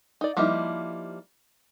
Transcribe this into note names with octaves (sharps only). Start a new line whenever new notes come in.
D#4 D5
F3 G3 A#3 D#4 E4